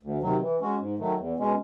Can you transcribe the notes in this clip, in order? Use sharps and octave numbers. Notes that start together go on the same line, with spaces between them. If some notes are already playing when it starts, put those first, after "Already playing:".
D2
C3 D#3 F#3
E3
G#3 C#4 F#4
G#2
D#3 F#3 A3
E2
B2 G#3 C#4